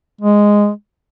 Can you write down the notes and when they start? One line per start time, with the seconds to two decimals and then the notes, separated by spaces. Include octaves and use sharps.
0.21 G#3